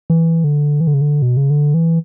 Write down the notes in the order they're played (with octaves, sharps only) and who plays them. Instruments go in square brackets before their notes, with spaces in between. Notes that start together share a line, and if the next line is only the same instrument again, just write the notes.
[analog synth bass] E3
D3
E3
D3
C#3
D3
B2
C#3
D3
E3